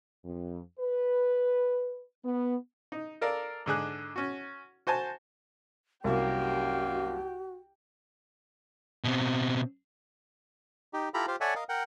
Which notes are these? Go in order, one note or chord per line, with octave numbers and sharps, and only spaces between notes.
F2
B4
B3
D#4
A4 A#4 D5 F5
G#2 D3 G#4 F#6
C#4 F#4
F#4 C5 G#5 A5
C2 F#2 A#3 F#4 G4
B2 C4
D#4 G4
E4 F4 G4 A4 A#5 B5
F4 G4 C5 F5
A4 C#5 D5 E5 F#5 G#5
A#4 D#5 F5
A#4 F#5 G5